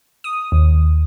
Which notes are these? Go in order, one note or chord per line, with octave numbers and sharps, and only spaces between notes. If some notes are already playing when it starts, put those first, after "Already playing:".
D#6
D#2